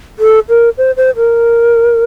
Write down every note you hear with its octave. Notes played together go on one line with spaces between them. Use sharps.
A4
A#4
C5
C5
A#4